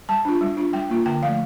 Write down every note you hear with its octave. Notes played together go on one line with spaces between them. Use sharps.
G3 A5
D4 F4
G3
D4 F4
G3 G5
A#3 F4
D3 G5
F3 A3 F5